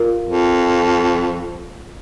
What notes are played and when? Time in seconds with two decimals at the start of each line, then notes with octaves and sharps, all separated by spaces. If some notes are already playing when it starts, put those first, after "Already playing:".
Already playing: F4 A#4
0.25 F2